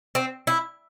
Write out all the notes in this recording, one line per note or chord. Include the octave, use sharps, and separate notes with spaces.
C4
E4